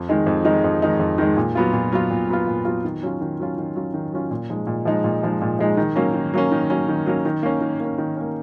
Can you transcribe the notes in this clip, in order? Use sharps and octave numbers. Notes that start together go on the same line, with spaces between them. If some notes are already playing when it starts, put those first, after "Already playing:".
Already playing: F2
D#3 G#3 D#4
F2
D#3 G#3 D#4
F2
D#3 G#3 D#4
F2
D#3 G#3 D#4
A#2
F#3 B3 F4
A#2
F#3 B3 F4
A#2
F#3 B3 F4
A#2
F#3 B3 F4
D#3
F#3 C#4 F4
D#3
F#3 C#4 F4
D#3
F#3 C#4 F4
D#3
F#3 C#4 F4
A#2
F3 G#3 D#4
A#2
F3 G#3 D#4
A#2
F3 G#3 D#4
A#2
F3 G#3 D#4
D#3
F#3 A#3 C#4
D#3
F#3 A#3 C#4
D#3
F#3 A#3 C#4
D#3
F#3 A#3 C#4
D#3
A#3 C#4
D#3
A#3 C#4
D#3
A#3 C#4